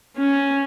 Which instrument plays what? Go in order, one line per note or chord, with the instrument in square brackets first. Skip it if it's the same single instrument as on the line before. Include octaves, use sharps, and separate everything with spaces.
[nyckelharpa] C#4